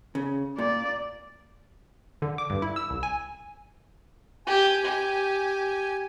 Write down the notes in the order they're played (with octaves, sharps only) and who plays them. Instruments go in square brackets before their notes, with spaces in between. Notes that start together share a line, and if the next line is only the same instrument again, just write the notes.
[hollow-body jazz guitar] C#3
[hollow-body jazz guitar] A#2 [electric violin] D5
[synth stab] D3
D6
G2
E4
E6
C2
G#5
[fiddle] G4 [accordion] G#5
[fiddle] G4